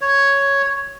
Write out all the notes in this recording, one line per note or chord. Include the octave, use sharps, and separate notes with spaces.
C#5